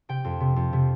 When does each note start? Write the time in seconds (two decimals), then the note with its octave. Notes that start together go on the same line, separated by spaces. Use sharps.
0.09 C3 G5
0.25 F2
0.40 C3
0.56 F2
0.73 C3